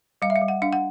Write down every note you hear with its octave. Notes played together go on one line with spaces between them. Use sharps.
G3 F5
E5
F5
G3
F#5
D4 F5
F#5